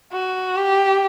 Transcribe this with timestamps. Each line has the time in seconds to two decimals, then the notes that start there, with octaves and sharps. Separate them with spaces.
0.12 F#4
0.56 G4